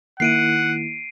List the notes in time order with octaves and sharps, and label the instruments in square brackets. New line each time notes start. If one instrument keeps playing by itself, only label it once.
[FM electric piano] D#3 A#3 E4 [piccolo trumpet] F#5 [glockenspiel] C7 D7 D#7